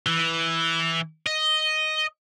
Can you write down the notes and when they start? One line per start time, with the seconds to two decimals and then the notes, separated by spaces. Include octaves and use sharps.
0.06 E3
1.26 D#5